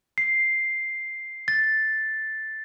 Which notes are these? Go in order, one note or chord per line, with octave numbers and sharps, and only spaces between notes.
C7
A6